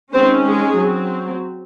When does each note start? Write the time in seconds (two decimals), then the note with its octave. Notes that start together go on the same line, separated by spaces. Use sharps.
0.13 D#3 G#3 C4 C#4 C5
0.45 G#3 G#4
0.78 F#3 C4